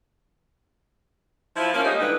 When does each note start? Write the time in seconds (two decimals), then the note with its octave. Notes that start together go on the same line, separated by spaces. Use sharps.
1.56 F3 E4
1.74 A#3 C#4
1.85 G3 G#3 D#4
2.01 D3 E3 G3 B4